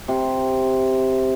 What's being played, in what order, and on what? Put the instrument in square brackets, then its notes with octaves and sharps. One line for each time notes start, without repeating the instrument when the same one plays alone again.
[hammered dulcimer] C3